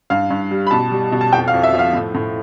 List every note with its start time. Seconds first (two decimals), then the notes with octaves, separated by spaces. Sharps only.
0.10 G2 F5
0.30 G2
0.51 G3
0.67 B5
0.71 B2 A5
0.91 G3
1.12 B2
1.21 A5
1.33 F2 G5
1.48 F5
1.54 F2
1.63 E5
1.74 F3
1.79 F5
1.93 A2
2.15 A2